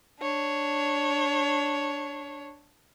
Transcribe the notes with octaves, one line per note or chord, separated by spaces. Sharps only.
D4 C#5